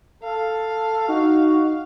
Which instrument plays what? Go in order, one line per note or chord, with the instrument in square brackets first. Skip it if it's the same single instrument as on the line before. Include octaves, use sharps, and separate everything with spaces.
[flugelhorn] A4 [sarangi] F5
[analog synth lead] D#4 [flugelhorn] F#4